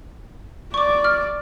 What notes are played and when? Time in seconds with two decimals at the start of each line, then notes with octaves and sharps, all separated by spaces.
0.74 D5 C#6 D6
1.04 F6